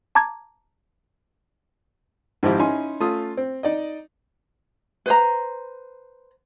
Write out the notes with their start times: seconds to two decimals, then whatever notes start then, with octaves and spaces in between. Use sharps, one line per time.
0.15 A5 A#5 D6 G#6
2.43 G#2 D#3 F3 C4 E4 G4
2.59 C#4 D#4 E4 G#5 C6
3.00 A3 C#4 F4 D#6
3.37 C4
3.63 D#4 D5 D#5
5.06 B4 C5 A#5